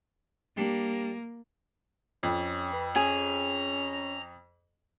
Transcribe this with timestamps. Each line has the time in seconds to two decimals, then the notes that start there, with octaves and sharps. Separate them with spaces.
0.57 G3 A#3 D4
2.23 F2 C#4
2.73 B4
2.96 C#4 G#4 A#5